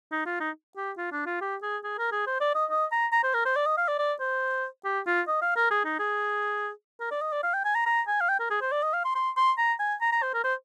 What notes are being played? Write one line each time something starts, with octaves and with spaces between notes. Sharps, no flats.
D#4
F4
D#4
G4
F4
D4
F4
G4
G#4
G#4
A#4
G#4
C5
D5
D#5
D#5
A#5
A#5
C5
A#4
C5
D5
D#5
F5
D5
D5
C5
G4
F4
D#5
F5
A#4
G#4
D#4
G#4
A#4
D5
D#5
D5
F5
G5
G#5
A#5
A#5
G#5
F5
G5
A#4
G#4
C5
D5
D#5
F5
C6
C6
C6
A#5
G#5
A#5
A#5
C5
A#4
C5